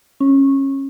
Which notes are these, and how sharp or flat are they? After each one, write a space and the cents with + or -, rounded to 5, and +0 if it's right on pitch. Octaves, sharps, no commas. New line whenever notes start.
C#4 -20